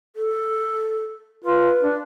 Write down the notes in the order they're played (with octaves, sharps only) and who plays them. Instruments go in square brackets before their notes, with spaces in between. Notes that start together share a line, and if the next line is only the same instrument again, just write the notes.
[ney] A4
[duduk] F4 [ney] B4
[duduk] D4